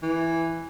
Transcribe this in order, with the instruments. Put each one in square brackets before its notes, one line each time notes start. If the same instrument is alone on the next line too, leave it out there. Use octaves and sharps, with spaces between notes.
[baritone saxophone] E3